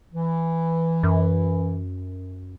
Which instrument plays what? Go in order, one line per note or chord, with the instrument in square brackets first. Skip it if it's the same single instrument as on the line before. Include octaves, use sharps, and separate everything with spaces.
[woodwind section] E3
[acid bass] F#2